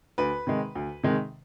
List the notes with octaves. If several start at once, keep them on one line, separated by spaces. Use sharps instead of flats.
D2 B4
C3 D#3 G#3
D2
C3 D#3 G#3